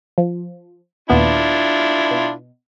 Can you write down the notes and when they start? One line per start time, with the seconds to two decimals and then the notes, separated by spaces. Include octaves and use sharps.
0.18 F3
1.10 D#2 A#2 B3 D4 E4 F4
2.11 B2